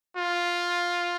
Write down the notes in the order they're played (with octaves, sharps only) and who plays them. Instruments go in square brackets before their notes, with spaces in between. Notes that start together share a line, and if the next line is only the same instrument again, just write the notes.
[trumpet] F4